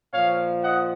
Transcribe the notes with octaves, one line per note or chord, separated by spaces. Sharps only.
A#2 F3 C#5 F5
D#5 F#5